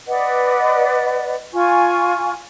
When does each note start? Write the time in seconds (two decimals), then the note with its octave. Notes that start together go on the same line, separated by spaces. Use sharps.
0.07 B4 D5 D#5 F#5
1.54 F4 G#5 C#6